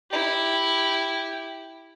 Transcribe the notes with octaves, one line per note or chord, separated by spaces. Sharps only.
E4 G4